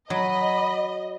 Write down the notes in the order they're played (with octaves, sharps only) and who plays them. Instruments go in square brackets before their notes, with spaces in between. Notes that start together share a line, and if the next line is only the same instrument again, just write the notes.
[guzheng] F#3 [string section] D#5 [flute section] B5